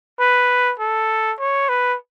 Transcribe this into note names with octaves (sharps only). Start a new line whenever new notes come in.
B4
A4
C#5
B4